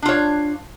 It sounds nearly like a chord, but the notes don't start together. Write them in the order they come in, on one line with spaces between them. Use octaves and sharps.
D4 F4 C#5